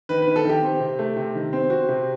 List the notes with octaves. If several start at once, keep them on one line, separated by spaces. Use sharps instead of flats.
D#3 B4
B4
D#3
A4
D#3 G4
C4
C3
A3
C3
D#3
C4
C4 F#4
C3